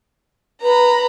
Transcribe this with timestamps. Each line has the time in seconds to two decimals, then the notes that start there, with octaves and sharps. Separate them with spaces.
0.62 B4 A#5 B5